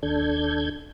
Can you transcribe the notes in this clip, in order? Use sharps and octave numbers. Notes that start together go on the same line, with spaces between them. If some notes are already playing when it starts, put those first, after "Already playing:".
D#2 D4 A4 G6 G#6